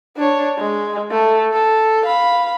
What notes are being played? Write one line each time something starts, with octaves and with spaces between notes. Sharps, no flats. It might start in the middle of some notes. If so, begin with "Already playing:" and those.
D4 C#5
G#3
A3
A4
F5 B5